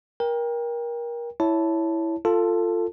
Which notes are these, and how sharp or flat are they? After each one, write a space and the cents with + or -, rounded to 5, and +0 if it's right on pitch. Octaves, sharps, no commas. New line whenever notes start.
A#4 +25 G5 +20
E4 +0 C#5 +10 A5 +0
F4 +0 A4 +20 A5 +0